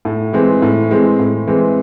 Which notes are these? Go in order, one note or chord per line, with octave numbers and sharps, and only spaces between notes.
A2
E3 G#3 C4
A2
E3 G#3 C4
A2
E3 G#3 C4